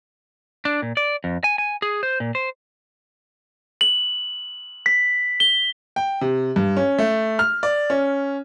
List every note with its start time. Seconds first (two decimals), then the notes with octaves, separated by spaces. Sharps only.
0.65 D4
0.82 A#2
0.97 D5
1.24 F2
1.44 G#5
1.58 G#5
1.82 G#4
2.03 C5
2.20 A#2
2.35 C5
3.81 F#7
4.86 B6
5.40 G7
5.96 G5
6.21 C3
6.56 G2
6.77 C#4
6.99 A3
7.39 F6
7.63 D5
7.90 C#4